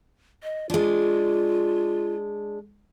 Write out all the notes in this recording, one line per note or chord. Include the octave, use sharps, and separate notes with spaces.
D#5
G#3 D4 F4